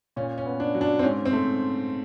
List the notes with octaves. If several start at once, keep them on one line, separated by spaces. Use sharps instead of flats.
A#2 C#4
C#4
B3
D4
F#3
D4
C4
G#2 C#4
C4
A3